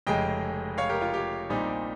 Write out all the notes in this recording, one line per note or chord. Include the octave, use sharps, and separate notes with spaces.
F1 F2 C#3 G#3 D#5 G5
C#5 F5
G4 A#4
F4
G4
A#1 A#2 G3 C4 D#4